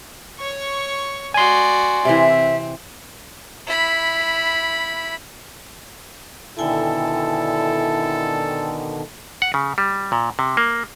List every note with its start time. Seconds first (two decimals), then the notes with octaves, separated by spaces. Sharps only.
0.38 C#5 C#6
1.34 F#4 D5 G#5 C6
2.05 C3 E3 C4 E5
3.67 E4 B5
6.59 B2 D3 D#3 E4 A4 G5 G#5
9.42 F#5
9.54 C#3
9.78 G3
10.12 A#2
10.39 C3
10.57 A#3